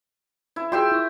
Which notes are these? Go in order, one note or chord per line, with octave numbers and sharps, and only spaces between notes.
E4
F4 F#4 G#4 E5 G5 C6
E4 C#6